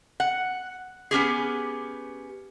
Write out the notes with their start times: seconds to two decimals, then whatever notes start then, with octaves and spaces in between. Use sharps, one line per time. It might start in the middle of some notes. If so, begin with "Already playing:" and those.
0.20 F#5
1.11 B3 C#4 G4 G#4